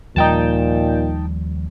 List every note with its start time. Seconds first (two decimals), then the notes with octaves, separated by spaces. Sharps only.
0.16 D#2 A#2 F3 G3 D#4 G5 A5